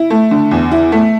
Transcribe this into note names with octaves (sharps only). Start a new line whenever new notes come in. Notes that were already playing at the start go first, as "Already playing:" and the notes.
Already playing: E4
A3
D3
E2
E4
A3